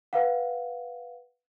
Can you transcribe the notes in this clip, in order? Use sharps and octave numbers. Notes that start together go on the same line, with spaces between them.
B4 F5 F#5